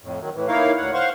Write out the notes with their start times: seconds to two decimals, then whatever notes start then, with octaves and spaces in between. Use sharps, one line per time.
0.02 F2 A2
0.20 D#3 F#3
0.34 A2 E3
0.48 A#3 D#4 E4 A#4 C#5 F5
0.77 D2 C#5 F#5
0.94 C5 F5 F#5 C6 C#6